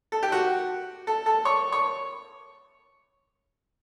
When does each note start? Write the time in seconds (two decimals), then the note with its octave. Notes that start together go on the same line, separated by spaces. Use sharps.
0.12 A4
0.23 G4
0.32 F#4
1.07 A4
1.26 A4
1.45 C#5
1.72 C#5